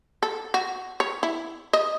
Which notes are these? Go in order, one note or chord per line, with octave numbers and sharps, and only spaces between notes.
A4
F#4
C#5
E4
D#5